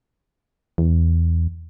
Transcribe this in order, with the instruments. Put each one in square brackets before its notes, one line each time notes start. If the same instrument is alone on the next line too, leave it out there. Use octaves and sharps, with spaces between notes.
[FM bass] E2